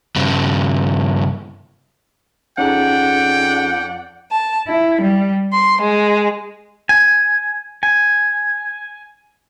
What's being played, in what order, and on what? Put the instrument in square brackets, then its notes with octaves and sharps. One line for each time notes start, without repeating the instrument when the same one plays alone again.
[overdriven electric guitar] G2 C#3
[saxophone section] F2 D5 F#5 [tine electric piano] C#4 D#4 G#4 [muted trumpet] G5
[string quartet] A5
E4
G3
C6
G#3
[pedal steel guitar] G#5
G#5